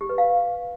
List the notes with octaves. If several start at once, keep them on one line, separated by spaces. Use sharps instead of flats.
G4
B4
F5